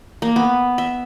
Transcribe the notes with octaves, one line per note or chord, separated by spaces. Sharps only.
A#3
B3
E5